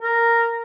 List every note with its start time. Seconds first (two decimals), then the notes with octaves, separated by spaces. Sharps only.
0.01 A#4